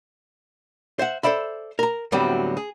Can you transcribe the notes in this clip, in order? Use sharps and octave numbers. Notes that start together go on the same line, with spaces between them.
C5 E5 F#5
A4 C5 D5 E5 B5
A#4 A#5
D2 A2 F#3 G3 B3 C4
G#4